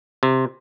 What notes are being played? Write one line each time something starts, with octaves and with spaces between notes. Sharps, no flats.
C3